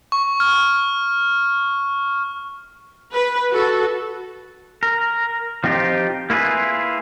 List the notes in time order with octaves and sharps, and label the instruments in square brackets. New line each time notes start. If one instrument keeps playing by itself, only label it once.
[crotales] C#6
F6
[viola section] B4
F#4 A4
[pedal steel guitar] A#4
F3 C4 D#4 F4 G4
A#3 E4 F4 G#4 B4